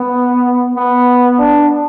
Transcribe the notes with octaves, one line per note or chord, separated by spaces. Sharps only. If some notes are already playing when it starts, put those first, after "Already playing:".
Already playing: B3
B3
D4